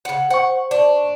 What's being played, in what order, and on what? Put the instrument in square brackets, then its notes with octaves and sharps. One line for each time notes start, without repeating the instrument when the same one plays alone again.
[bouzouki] C#3 F#5
[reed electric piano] C5 C#6 [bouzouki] F#5
[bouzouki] D4